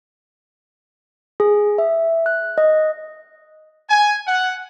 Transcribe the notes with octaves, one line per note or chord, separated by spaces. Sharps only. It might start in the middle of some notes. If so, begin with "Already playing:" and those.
G#4
E5
F#6
D#5
G#5
F#5